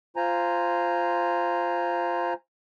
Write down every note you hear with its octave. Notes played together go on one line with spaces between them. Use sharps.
F4 C5 G#5 A#5